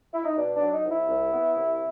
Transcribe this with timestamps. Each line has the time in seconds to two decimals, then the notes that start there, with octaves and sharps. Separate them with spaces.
0.13 E4
0.25 D#4
0.37 B2 D4
0.55 D4
0.61 F#3
0.72 D#4
0.85 C2
0.91 E4
1.08 C2
1.32 B3
1.56 C2